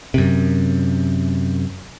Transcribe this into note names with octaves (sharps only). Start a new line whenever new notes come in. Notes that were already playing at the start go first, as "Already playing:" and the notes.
F#2 C3